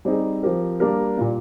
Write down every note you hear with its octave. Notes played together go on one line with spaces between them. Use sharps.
G3 C4 D#4 G#4
F3 C4 G4 A#4
G3 A#3 D4 G4 A#4
A#2 G3 A#3